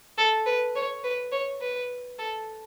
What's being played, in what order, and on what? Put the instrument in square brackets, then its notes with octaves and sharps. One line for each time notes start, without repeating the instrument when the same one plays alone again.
[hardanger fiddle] A4
B4
C#5
B4
C#5
B4
A4